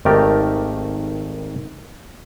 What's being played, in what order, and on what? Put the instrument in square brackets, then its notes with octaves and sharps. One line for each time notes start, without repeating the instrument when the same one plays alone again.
[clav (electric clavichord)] G#1 D#3 A3 G4 A#4 D5